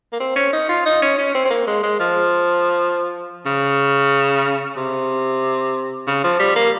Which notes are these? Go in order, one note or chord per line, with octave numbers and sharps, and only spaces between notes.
A#3
C4
C#4
D#4
F4
D#4
C#4
C#4
C4
C4
A#3
G#3
G#3
F3
C#3
C3
C#3
F3
G3
A#3